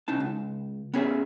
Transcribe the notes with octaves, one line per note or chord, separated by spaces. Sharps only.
C2 C#4 D#4 A5
C#2
B3 C#4 G#4 E5